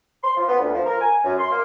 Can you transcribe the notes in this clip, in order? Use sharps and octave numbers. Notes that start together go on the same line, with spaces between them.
C6
F3
B3
D2
F3
A#4
G#5
F#2
C6
A#3